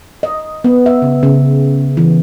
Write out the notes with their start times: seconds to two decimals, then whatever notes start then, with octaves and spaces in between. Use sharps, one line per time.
0.23 D#5
0.64 B3
0.86 E5
1.02 C#3
1.23 C#3
1.97 E3